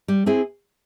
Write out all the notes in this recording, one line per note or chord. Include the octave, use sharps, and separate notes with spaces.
G3
C4 E4 G#4